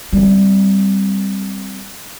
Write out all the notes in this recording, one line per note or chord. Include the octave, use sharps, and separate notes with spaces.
G3 C4